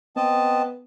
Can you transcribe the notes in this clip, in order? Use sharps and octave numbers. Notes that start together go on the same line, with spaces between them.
B3 C4 D#5 A5